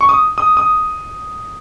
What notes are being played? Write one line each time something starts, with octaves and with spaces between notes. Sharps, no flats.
C#6
D#6
D#6
D#6